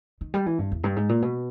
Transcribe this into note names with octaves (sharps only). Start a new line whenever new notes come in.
D#3
G3
E3
G2
E2
G2
G#2
A#2
B2